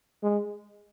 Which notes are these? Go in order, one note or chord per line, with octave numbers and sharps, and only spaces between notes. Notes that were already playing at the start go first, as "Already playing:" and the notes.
G#3